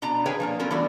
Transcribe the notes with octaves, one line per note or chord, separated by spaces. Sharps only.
F2 B2 D4 A#5
G#4 B4 C#5 F5 G5 G#5
F3 A#3 D4
F#3 B3 C#4 F4 A#4 A5
E3 G3 A3 B3 D4 F#4